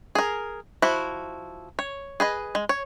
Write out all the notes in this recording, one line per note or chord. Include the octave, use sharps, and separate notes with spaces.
G#4 A#4
F3 E4 F#4
C#5
G#4 B4 D#5
G#3
C#5